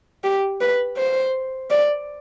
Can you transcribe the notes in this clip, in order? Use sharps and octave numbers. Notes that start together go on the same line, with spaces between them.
G4
B4
C5
D5